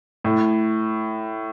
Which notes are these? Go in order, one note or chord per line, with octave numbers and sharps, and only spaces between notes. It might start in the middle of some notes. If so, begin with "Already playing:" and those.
A2